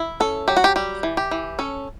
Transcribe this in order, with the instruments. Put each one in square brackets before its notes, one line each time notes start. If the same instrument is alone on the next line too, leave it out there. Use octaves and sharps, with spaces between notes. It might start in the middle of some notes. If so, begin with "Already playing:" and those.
Already playing: [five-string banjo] E4
C#4 A4
F#3 G4
F#4
G4
G3 G4
E3
G4
E3
C#4 A4